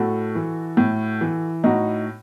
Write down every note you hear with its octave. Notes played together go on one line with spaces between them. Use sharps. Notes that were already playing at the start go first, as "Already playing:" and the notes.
Already playing: A2 F#4 A4
E3
A2
E3
A2 D#4 F#4